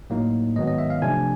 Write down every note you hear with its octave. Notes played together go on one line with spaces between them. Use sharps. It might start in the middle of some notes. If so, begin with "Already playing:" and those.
A2 F#3 A#3 D#4
G#2 D#3 F#3 B3 D#5
D#5
E5
F5
C3 F3 A3 D4 G#5